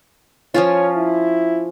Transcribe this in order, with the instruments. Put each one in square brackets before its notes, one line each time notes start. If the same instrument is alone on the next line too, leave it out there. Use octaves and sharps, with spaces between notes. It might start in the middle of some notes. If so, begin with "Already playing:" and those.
[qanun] F3 C#4 F4 [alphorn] C#5
[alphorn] E4